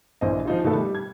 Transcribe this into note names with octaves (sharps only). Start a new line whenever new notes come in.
A#1 E3 C5 D#5
F3 D#4 F4
B2 D#3 A3 B3 A4 B4
G3
G#6